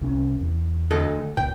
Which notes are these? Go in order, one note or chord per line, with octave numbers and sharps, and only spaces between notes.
C2 C3 C#4
E2
D2 A4 D#5
C#2 A#2 G5